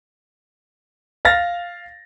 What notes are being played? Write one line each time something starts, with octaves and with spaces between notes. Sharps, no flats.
F5 F6 A6 A#6